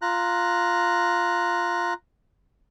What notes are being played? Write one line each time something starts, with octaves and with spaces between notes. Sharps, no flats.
F4 A#5 F#6